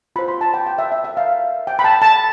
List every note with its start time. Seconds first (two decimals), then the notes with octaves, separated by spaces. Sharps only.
0.16 F4 C5 B5
0.28 C6
0.41 A5
0.54 G5
0.66 G5
0.79 E5
0.92 E5
1.04 E5
1.17 F5
1.67 G5
1.79 B5
1.84 A5
2.02 A5